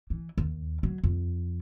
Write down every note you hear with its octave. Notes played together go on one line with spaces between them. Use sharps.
E3
D#2
F#3
F2